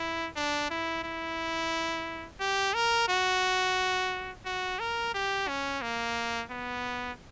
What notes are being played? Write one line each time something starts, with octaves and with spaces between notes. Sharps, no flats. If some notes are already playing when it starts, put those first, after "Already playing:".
Already playing: E4
D4
E4
E4
G4
A#4
F#4
F#4
A#4
G4
C#4
A#3
B3